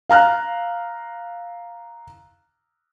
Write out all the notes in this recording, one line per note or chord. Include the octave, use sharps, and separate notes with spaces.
F5 A#5 F6 F#6